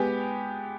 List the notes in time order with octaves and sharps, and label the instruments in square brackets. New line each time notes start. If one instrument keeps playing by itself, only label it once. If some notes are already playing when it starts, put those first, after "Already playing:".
Already playing: [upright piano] G#3 B3 G4